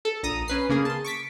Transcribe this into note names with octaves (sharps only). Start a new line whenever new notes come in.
A4
A#1 A#5 D#6
C#4 B4 C7
C#3 A#3 G#4
A5 C6
C#6 D6 B6